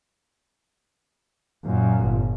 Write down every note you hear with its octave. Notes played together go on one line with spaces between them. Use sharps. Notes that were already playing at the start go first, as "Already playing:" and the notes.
F#2 A#2
G1